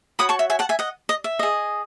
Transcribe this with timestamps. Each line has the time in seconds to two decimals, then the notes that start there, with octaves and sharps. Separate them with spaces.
0.19 F#4 C#5 B5 D#6
0.29 A5 C#6
0.39 E5
0.50 E5 G#5
0.59 F#5 A5
0.69 E5 G#5
0.79 D#5 F#5
1.09 D#5
1.24 E5
1.39 G#4 D#5